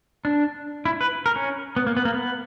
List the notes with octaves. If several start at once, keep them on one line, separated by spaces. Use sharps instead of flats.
D4
E4
B4
A#4
C#4
B3
A#3
B3
A#3
B3